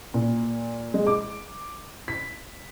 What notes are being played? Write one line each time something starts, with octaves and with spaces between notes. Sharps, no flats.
A#2
G#3
D6
B6